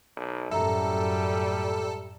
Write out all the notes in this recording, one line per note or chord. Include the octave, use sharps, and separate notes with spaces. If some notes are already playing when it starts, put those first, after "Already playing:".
B1
F#2 A2 G3 A4 E5 A#5